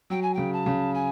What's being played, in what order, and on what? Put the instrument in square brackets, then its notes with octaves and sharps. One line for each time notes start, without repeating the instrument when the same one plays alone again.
[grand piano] F#3 [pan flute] G5
[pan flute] G#5
[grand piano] C#3 [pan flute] G5
[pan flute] A5
[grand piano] C#3
[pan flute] G#5